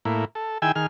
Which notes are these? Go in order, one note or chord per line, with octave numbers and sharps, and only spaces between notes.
A2 A#3 E4
A4
D#3 E4 G#4 G5 G#5 E6
D#3 G#4 F6